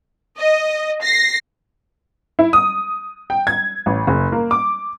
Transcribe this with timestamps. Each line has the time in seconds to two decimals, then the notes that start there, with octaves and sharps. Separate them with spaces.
0.38 D#5
1.02 A#6 C7
2.39 E4
2.53 D#6
3.30 G5
3.47 G#6
3.86 A1
4.07 F#1
4.32 A#3
4.51 D6